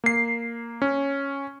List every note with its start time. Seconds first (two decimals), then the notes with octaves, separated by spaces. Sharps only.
0.04 A#3 C7
0.82 C#4